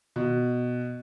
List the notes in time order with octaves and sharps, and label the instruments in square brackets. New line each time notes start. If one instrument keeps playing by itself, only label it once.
[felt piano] B2